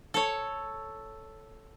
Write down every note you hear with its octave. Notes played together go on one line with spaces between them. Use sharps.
A4 C#5